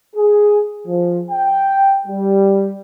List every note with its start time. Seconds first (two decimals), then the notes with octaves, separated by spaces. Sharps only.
0.16 G#4
0.87 F3
1.30 G5
2.07 G3